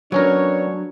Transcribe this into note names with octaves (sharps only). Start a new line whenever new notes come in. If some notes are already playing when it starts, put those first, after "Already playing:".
F#3 B3 C#4 D4 A#4 C#5